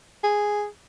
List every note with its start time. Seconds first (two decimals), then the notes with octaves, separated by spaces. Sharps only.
0.24 G#4